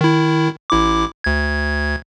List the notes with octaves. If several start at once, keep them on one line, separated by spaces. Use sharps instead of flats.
D#3 E4
A1 E4 D6
D2 G#6